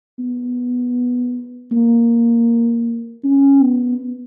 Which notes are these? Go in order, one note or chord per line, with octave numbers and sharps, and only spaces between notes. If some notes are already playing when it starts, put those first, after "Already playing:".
B3
A#3
C#4
B3